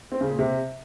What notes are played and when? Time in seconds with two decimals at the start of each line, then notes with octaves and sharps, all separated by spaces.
0.12 C4
0.21 C#3
0.30 A#2
0.39 C3